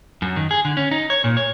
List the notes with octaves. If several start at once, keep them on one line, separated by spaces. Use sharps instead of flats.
F#2
D#3
G#4
D3
C#4
D#4
C#5
A#2
C#5